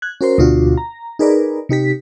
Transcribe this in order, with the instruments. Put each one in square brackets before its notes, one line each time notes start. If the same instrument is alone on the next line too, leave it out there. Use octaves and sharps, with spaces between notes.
[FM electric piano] F#6 G#6
C#4 F#4 A#4 C5 C6
D2 B2 D4 F4 F#4
A#5
D#4 G#4 A#4 B4 D5
C3 D#4 G4 B6